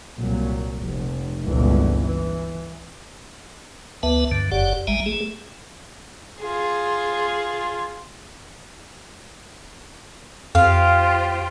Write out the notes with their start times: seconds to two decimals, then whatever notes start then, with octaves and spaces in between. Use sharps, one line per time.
0.17 C2 A#2 F#3
0.80 F1
1.45 G1 C#2 A#2 E3
1.99 E3
4.03 D2 B3 B4 E5 A5
4.31 G2 D3
4.52 F#1 F#2 G4 D5 F#5
4.87 A1 G3 G#3 E5 G#5 A#5
5.06 A3 G#4
6.41 F4 G#4
10.55 F2 F4 G4 C5 F5